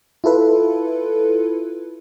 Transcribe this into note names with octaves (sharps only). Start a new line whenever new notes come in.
E4 F4 A4 B4